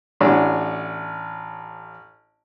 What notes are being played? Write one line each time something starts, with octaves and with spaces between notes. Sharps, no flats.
A1 C#4 D4 F#4